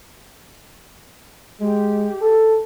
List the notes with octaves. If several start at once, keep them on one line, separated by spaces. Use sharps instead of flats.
G#3 G4
A4